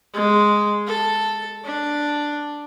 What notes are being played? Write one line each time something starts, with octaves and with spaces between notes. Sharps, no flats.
G#3
A4
D4